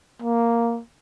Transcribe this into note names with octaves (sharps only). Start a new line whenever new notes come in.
A#3